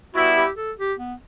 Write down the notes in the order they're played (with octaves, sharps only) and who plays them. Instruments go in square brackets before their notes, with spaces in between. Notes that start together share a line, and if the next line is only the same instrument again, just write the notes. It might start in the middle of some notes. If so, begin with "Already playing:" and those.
[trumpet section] G3 B3 E4 [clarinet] F#4
[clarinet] G4
A4
G4
B3